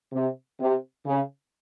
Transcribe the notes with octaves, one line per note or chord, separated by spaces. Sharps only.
C3
C3
C#3